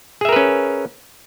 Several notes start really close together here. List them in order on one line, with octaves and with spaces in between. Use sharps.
G#4 E5 A#4 B4 C#4